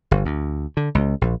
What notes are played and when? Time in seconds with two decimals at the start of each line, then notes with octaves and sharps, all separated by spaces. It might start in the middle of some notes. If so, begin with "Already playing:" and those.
0.11 G1
0.25 D2
0.77 D3
0.95 C#2
1.21 A#1